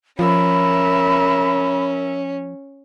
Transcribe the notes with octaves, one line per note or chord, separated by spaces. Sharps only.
F3 C#4 A#4 E5 B5